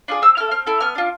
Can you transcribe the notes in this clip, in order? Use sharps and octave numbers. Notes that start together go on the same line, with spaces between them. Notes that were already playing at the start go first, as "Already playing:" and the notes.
D4 F4 G#4
C4 E6
E4 A4 F6
C4 F6
E4 A4
B3 F6
D4 F4